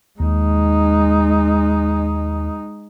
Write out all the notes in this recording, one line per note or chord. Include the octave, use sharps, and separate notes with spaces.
D#2 G#3 D#4